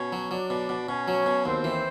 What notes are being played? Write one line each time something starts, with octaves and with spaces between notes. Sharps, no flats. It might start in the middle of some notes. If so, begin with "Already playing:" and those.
Already playing: B2 C#4 C#5
F#3
F#3 D4 D5
B2
B2
B2 C#4 C#5
F#3
B2
D#2 C4 C5
E3